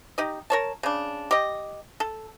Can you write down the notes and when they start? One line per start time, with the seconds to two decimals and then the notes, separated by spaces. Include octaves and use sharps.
0.18 D#4 G4 D#5
0.50 A#4 C#5 A5
0.83 C#3 D4
1.31 G4 D#5
2.00 A4